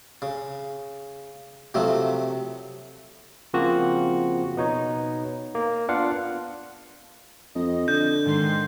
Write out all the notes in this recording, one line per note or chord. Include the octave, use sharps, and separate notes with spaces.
C#3
C3 F3 F#3 A3
C#3 F3 A#3 C4 F4 F#4
B2 B3 D#4 C#5
A#3
B3 D4 F4 F5 F#5
F2 D#5
D3 G6
G#2 D#3 C6